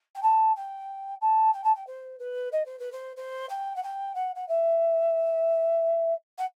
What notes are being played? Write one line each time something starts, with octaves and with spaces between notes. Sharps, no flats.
G5
A5
G5
A5
G5
A5
G5
C5
B4
D#5
C5
B4
C5
C5
G5
F#5
G5
F#5
F#5
E5
F#5